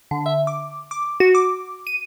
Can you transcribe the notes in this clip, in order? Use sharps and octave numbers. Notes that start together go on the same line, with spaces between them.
D3
E5
D6
D6
F#4
D6
D#7